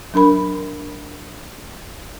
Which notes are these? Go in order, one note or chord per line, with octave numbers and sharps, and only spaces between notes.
F#3 D4 A#4 B5